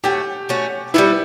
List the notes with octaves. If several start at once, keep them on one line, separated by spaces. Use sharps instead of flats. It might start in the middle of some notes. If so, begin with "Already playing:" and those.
A3 C#4 F#4 G4
A3 C#4 F#4
G3 B3 E4 F#4 B4